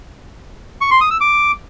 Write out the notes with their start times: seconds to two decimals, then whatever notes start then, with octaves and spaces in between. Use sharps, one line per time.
0.81 C#6
0.91 C6
1.01 D#6
1.11 E6
1.21 D6